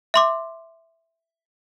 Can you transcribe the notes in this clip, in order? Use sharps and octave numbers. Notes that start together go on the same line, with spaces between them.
E5 C6 D6